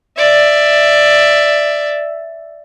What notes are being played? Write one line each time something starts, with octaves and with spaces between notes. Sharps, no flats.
D5 E5